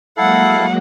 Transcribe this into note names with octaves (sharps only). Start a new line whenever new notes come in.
F#3 G#3 A#3 E4 A4 F5 F#5